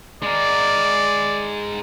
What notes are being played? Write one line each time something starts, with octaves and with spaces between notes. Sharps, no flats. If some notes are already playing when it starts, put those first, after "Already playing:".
G#3 A#4 D5